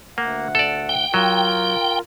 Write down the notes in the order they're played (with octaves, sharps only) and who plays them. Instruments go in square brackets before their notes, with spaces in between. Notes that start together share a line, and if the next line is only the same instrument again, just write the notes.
[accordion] D2 F#5 [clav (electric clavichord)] A#3
[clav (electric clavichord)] A4 D5
[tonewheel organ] G5
[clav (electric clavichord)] F#3 [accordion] F4 A#4